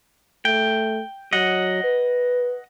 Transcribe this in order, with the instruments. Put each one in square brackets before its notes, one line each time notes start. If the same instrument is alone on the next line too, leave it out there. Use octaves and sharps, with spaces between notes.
[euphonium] A3 [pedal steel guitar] G5
[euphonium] F#3 [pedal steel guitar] D#5 F#5
[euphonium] B4